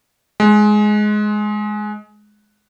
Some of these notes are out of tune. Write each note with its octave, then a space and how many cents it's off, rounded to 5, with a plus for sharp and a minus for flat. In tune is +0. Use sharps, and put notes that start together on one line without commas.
G#3 +15